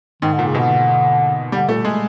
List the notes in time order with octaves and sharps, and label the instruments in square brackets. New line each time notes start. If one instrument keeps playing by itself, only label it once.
[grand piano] G#2 [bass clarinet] D#3
[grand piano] A#2 [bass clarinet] D3
[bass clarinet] C#3
[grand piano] B2
[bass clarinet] D3
[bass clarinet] D3 [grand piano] G3
[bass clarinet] A#2 [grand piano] A3
[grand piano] G#3